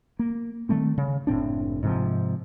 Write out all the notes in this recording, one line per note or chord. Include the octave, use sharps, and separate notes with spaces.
A#3
D#3 G3 A3 C4
C#3
F#1 A2 C4 D4
G#2 C3 D#3 F3